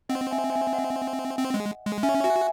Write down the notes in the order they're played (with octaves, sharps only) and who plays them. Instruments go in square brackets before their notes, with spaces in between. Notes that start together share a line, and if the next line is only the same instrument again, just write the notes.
[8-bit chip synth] C4 [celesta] D#5 F#5
[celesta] E5 G#5
E5 G#5
D#5 F#5
[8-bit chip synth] C4
G#3
G#3
[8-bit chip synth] C#4 [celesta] E5 G#5
[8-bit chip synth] F#4 [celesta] E5 G#5